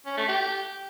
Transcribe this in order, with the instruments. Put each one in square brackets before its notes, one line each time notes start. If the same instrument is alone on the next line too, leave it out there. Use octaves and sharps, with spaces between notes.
[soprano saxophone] C#4
A3
G4